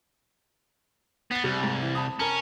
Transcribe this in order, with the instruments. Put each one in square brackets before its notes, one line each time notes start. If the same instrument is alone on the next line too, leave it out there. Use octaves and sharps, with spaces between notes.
[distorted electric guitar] B3 [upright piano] A6 C7
[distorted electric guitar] C2 [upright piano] G3
[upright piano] G#2
E3
A5 B5 D#6
[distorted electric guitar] C#4 [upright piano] A#4 A5